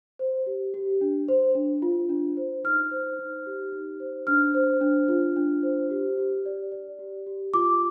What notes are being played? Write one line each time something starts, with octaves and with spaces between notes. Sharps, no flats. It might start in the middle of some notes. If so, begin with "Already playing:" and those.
C5
G4
G4
D4
C5
D4
F4
D4
C5
D#4 F6
C5
D#4
G4
D#4
C5
D4 F6
C5
D4
F4
D4
C5
G4
G4
D5
D5
G4
G4
F4 D6